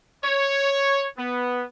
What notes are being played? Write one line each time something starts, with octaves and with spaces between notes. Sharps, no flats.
C#5
B3